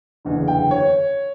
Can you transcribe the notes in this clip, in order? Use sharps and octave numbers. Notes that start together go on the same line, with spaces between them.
F#1 E2 D3
G5
C#5